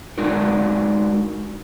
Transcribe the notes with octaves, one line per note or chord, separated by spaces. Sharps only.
G#3 D4 D#4 F#4 A#4